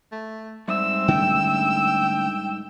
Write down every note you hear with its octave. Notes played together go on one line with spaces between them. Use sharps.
A3
G#2 G3 C4 E5 E6
D3 A3 C#4 G5